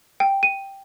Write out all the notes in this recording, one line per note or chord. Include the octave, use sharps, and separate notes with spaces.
G5
D#7